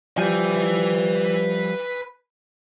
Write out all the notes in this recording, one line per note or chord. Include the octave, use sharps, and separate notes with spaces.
F3 G3 B4 G#5